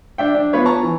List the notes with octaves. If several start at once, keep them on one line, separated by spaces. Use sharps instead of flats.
D4 E5 G5
D4
B3 F4 B4 C#5
C#5 A5 A#5 C#6
E3